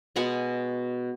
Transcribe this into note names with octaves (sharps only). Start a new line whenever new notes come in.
B2 G#3 B3 F#5 G#5